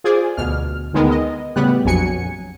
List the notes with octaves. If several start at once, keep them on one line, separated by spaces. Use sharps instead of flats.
F4 G#4 C5 D5
D2 B2 F6
D2 D#3 G#3 B3 A#4
D#5
A2 C#3 G3 B3 G4 F#6
A#1 F2 F#3 G#5 C#7